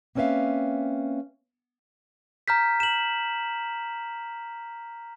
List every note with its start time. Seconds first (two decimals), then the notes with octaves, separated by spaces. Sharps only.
0.15 A#3 C4 C#4 B4 E5 F5
2.48 A#5 F6 G6 B6
2.80 E7 F#7